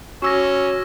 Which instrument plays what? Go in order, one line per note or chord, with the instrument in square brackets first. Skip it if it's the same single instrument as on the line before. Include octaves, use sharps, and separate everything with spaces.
[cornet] C#4 [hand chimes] F#4 D6 [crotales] C#6 E6 A#6